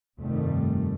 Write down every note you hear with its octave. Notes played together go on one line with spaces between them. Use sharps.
F1 G2 D#3 G3 A3